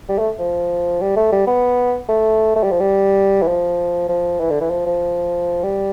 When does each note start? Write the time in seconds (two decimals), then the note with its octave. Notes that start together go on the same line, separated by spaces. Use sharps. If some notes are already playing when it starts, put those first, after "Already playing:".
0.09 G3
0.19 A3
0.39 F3
1.01 G3
1.16 A3
1.32 G3
1.47 B3
2.08 A3
2.55 A3
2.63 G3
2.71 F3
2.80 G3
3.42 E3
3.47 F3
4.09 F3
4.40 E3
4.50 D3
4.60 E3
4.70 F3
4.86 F3
5.63 G3